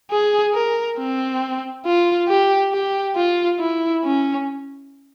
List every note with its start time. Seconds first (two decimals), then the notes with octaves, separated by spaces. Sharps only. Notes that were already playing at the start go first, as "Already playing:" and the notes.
0.11 G#4
0.54 A#4
0.99 C4
1.85 F4
2.29 G4
2.73 G4
3.16 F4
3.60 E4
4.04 C#4